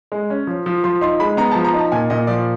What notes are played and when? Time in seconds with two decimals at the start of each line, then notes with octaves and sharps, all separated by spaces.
0.12 G#3
0.30 C#4
0.47 F3
0.66 F3
0.84 F3 C6
1.01 D#4 C6
1.20 G#3 B5
1.37 B3 A#5
1.51 A5
1.55 F3
1.65 A#5
1.74 D#4
1.79 A5
1.92 A#2 G#5
2.10 A#2 D#5
2.27 F3 D5